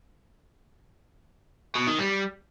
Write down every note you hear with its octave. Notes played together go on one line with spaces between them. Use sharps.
B2
D#3
G3